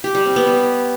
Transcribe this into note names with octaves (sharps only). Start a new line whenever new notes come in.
G4
G3
C4
B3
G3